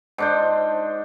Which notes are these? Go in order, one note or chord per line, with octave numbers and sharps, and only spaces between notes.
G#2 D4 C5